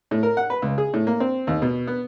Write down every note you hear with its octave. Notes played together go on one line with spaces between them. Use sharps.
A2
A#4
F#5
B4
C#2
G#4
A2
A#3
C4
D#2
B2
B3